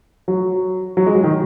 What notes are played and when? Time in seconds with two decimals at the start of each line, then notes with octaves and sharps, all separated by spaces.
0.28 F#3
0.97 F#3
1.06 G#3
1.15 F#3
1.24 D#3